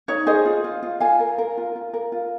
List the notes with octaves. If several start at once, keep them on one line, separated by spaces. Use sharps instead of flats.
D#4 C#5
G#4 C5 D#5
F4
F4
F4
F4 F5 G#5
A#4
A#4
F4
F4
A#4
F4